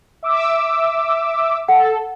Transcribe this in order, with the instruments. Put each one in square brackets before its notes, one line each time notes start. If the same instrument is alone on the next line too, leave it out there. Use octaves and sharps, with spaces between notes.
[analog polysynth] E5 D6 E6
[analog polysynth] A4 [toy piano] F#5